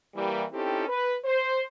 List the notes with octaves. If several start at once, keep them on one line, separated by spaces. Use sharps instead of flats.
E3 G3 A#3
C4 C#4 D#4 E4 G4 A4
B4
C5